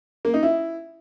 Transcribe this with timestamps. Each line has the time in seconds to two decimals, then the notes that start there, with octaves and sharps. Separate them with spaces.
0.25 A#3
0.34 D#4
0.43 E4